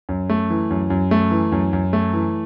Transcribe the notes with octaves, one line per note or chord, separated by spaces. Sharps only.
F#2
A3
E3
F#2
F#2
A3
E3
F#2
F#2
A3
E3